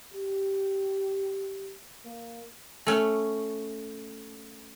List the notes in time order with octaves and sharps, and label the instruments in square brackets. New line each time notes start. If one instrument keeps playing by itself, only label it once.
[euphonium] G4
A#3
[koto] A3 C#4